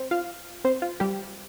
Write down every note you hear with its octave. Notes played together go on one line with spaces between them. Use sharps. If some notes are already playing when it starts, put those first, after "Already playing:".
Already playing: C4 C5
F4 F5
C4 C5
F4
G3 G4